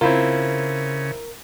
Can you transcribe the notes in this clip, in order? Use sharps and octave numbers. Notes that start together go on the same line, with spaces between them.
C#3 C4 E4 F4 A#4